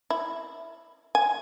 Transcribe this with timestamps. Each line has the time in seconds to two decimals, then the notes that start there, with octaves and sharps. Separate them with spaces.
0.10 E4
1.15 G#5